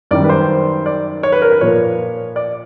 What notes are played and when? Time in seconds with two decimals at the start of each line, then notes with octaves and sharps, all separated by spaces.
0.11 F#2 D#3 G3 D5
0.24 B4
0.29 C5
0.86 D5
1.23 C#5
1.32 B4
1.42 A#4
1.52 B4
1.61 A#2 F3 A#3 C#5
2.36 D5